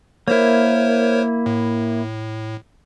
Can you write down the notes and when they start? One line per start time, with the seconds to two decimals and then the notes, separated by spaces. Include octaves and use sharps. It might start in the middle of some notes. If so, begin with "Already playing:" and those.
0.28 A#3 E4 A#4 C5 C#5
1.46 A2